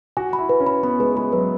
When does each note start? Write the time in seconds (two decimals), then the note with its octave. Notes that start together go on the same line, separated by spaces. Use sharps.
0.17 F#4 G#5
0.33 B5
0.39 E4
0.49 B4
0.60 C#4
0.67 B5
0.83 B3 B5
1.00 G#3 B4
1.16 G#3 B5
1.32 F#3 B4